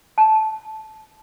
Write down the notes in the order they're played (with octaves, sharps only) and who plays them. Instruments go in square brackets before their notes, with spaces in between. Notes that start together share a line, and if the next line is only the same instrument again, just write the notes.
[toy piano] A5